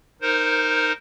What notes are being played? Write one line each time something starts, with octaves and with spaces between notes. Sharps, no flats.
D#4 A#4 C5